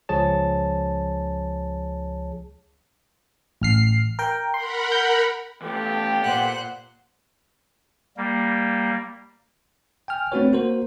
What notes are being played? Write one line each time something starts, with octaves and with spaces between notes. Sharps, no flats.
C#2 F3 G#4 C#5 A5
A1 F6 C7
A#4 G5
A#4 F#5 B5 C6
G6
E3 A3 B3 F4 G4 A4 G5
A#2 C5 F#5 F#6
G3 A#3
G5 G#5 F6
A3 C4 D4 F#4 B4 C#5
A#3 F#4 A#4 C5